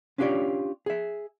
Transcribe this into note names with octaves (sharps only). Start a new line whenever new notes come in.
C#4 D4 F4 G4 C#5 D5
G#4 E5